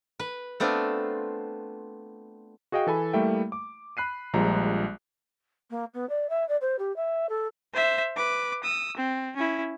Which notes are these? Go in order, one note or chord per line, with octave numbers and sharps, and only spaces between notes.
B4
A3 B3 C4 D4 F4
F#4 G#4 D#5 F5 G5
E3 A4 G#5 B5
G3 A3 A#3 E4 E5 G5
D6
B5 F#6 C7 D#7
A#1 F3 G3 G#3 A#5
A#3
B3
D5
E5
D5
C5
G4
E5
A4
C5 E5
B4 D6
D#6 E6
C4
C#4 E4